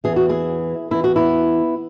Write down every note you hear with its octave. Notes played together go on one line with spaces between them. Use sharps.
E2 E3 G#4
F#4
E4 G#4
E2 E3 E4
F#4
B3 E4